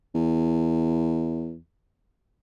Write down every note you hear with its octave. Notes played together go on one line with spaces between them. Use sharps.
E2